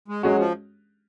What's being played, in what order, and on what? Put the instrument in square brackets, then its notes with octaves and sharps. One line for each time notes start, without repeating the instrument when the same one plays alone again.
[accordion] G#3
[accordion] F#3 [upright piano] G#3 C#4 F#4
[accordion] F3